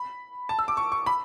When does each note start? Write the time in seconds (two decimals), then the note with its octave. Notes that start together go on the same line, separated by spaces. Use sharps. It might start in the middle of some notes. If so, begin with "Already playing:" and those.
Already playing: B5
0.49 A5
0.59 E6
0.68 D6
0.77 C#6
0.92 C#6
1.06 B5